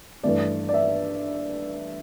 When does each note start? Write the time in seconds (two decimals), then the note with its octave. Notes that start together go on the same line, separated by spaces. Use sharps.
0.23 G2 E3 A3 D5
0.69 D5
0.74 E5